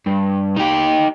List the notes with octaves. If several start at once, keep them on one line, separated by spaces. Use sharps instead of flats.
G2
D#4 G4